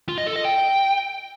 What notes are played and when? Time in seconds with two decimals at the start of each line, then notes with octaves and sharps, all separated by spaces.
0.09 F4
0.18 D#5
0.27 A4
0.36 D#5
0.45 G5